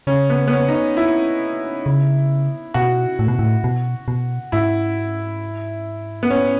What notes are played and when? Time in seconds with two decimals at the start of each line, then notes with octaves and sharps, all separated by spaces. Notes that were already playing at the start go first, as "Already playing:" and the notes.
0.07 C#3 C#4
0.30 B3
0.48 B3
0.53 C#4
0.69 D#4
0.74 C#4
0.97 E4
1.86 C#3
2.74 B2 F#4
3.19 A2
3.28 B2
3.39 A2
3.64 B2
4.08 B2
4.52 G#2 E4
6.23 B3
6.30 C#4